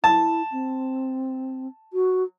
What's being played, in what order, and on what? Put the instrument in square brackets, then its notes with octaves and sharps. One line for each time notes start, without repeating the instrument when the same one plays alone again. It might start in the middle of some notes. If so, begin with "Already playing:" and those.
[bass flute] E4 [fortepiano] A5
[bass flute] C4
F#4